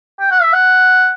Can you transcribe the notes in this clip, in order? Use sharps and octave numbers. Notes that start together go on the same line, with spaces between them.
G5
F#5
E5
F#5